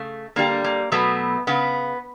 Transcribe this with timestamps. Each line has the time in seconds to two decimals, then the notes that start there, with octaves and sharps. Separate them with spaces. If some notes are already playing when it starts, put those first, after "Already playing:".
Already playing: C#3 A3
0.36 D3 G3 A#3
0.64 A#3
0.92 B2 F#3 A3 B3
1.47 C#3 B3